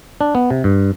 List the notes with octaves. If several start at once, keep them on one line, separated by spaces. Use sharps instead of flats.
D4
B3
C3
G2